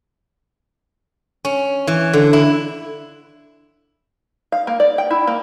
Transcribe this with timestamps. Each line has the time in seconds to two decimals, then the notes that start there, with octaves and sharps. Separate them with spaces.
1.45 C#4
1.87 E3
2.13 D3
2.33 E4
4.52 F5
4.67 A#3
4.80 D5
4.98 G5
5.11 E4
5.27 A#3